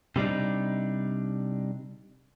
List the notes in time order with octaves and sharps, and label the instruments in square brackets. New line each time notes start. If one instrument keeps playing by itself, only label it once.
[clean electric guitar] C3 G3 D4 D#4